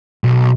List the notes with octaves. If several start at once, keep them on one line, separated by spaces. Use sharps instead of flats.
B1